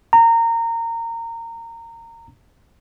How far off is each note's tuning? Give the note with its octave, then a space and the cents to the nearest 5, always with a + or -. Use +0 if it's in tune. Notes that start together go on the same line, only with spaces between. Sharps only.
A#5 -20